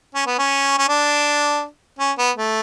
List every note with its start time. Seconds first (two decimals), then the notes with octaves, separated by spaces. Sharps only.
0.15 C#4
0.27 B3
0.39 C#4
0.78 C#4
0.89 D4
1.99 C#4
2.18 B3
2.37 A3